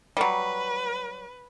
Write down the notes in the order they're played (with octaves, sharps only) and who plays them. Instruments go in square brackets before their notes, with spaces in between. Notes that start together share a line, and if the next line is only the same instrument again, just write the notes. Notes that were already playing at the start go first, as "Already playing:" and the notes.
[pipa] F#3 G3 [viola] B4